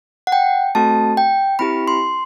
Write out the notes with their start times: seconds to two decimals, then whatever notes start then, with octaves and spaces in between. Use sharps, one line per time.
0.27 F#5
0.32 G5
0.75 A3 C4 F#4 A4 A5
1.17 G5
1.59 C4 E4 G4 B5
1.87 C6